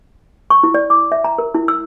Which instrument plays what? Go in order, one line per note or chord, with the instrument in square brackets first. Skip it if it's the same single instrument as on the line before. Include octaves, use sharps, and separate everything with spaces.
[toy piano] C#6
E4
D5
D6
E5
A#5
A#4
E4
E6